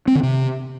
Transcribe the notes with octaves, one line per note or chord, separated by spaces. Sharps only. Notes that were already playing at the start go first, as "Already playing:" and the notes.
C4
D3
C3